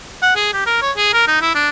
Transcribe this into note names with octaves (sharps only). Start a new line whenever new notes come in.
F#5
G#4
G4
A#4
C#5
G#4
A#4
D#4
E4
D4